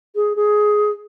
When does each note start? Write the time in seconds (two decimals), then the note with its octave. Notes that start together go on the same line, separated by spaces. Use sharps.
0.15 G#4
0.36 G#4